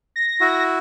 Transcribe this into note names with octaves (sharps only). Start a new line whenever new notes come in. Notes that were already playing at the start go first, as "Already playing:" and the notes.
A#6
E4 F#4